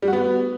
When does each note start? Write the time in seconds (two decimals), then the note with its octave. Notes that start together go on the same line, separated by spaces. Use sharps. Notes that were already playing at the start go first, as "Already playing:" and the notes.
0.02 G3
0.08 F#4
0.13 B3